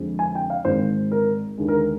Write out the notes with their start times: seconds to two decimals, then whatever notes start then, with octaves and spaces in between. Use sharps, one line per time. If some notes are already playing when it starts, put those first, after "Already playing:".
Already playing: F2 D3 G#3 C4
0.19 G#5
0.35 G5
0.50 F5
0.65 G#1 G#2 D#3 G#3 C4 C5
1.12 A#4
1.57 D#2 D3 G#3
1.68 A#4